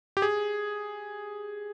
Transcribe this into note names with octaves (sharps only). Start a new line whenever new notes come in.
G4
G#4